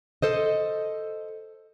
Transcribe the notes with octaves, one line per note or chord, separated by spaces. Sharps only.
A4 C5 D#5